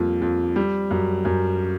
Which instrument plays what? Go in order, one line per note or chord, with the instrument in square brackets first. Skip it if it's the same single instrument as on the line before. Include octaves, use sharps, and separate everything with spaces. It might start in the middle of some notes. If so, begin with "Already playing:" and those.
Already playing: [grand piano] F2 G3 A#3
F2
G3
F#2
F#2